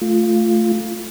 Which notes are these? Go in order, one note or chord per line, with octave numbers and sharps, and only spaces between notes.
A3 F4